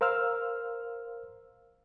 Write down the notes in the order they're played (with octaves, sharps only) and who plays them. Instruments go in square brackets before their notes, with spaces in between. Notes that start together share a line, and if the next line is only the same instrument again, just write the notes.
[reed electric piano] A#4 C5 F5 E6 F6